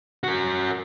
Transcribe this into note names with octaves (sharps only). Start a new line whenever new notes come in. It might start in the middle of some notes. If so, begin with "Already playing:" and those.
F#4 A#4